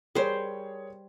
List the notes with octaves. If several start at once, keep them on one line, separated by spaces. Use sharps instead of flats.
G3 G#4 A#4 C5 C#5